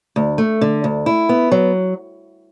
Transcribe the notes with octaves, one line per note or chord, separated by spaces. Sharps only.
D2
A3
D3
D2
E4
B3
F#3